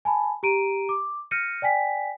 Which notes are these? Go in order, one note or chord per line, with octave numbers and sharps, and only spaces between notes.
G#5 A5 B5
G4 A#5 D7 D#7
D6
F6 G6 A#6 C#7 D#7
D5 G5 G#5 B6